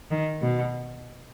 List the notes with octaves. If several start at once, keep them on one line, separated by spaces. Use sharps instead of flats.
D#3
B2